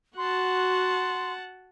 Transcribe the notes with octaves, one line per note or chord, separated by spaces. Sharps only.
F#4 F#5 A5 C6